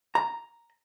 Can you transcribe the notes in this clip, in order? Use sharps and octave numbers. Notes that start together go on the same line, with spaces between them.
A#5